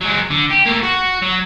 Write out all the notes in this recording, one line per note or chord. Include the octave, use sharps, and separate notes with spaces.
F#3 G#3
D3
G4
A3 A#3
F#4
F#3